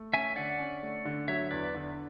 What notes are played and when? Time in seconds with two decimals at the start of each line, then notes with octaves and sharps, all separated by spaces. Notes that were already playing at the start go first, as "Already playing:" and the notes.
Already playing: A3
0.13 C#4 E5 G#5
0.36 D3 D5 F#5
0.59 C#4
0.83 A3
1.05 D3
1.28 F#3 C#5 E5
1.51 E2 B4 D5
1.75 D3